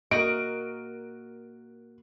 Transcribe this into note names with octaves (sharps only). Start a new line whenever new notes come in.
A#3 F#4 A#4 D#5 D7